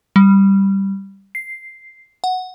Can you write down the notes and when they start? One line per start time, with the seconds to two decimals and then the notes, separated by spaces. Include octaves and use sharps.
0.16 G3
1.35 C7
2.24 F#5